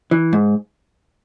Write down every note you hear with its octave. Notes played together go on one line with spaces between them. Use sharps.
E3
G#2